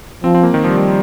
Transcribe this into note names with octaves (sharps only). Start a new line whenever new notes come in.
F3 C4
C4
A#3
D#3
F3 G3
D#3